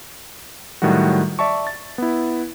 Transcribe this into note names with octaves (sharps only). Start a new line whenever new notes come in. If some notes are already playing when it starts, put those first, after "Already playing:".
A2 D#3 F#3 G3 F#4
D5 E5 A5 C#6
A6
B3 E4